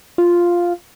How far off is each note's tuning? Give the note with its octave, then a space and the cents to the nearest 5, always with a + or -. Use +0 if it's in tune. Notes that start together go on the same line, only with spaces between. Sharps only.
F4 +0